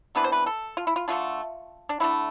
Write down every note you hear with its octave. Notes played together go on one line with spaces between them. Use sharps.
C3 E3 B3 D4 B4
C5
B4
A4
F4
E4
F4
D3 A3 D4 F4
D4
D3 A3 D4 E4